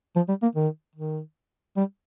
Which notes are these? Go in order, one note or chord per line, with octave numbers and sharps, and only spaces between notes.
F3
G3
A#3
D#3
D#3
G3